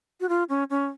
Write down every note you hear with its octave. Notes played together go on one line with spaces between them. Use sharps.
F#4
F4
C#4
C#4